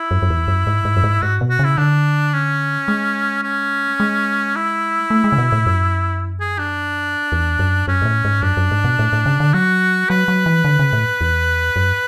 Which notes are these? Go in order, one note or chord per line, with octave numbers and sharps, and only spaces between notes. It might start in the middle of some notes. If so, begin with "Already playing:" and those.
Already playing: E4
F#2
F#2
E2
F#2
G#2
G#2
F#2
G#2
G#2 F#4
B2
F#4
C#3 E4
D3 D4
C#4
G#3
C#4
G#3
E4
A3
G#3
C#3
B2
A2
F#2
G#4
D4
E2
F#2
F#2 C#4
G#2
A2
G#2
F#2 D4
F#2
G#2
B2
A2
A2
C#3
D3
F#3 F#4
F#3 B4
F#3
E3
D3
C#3
A2
E2
F#2